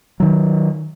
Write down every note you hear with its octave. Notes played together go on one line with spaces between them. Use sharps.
D#3 F#3